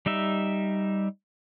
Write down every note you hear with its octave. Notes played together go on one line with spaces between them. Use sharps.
G3 D#4 E5